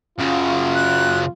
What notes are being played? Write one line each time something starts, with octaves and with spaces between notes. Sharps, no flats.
F#2 C#3 F4
F#6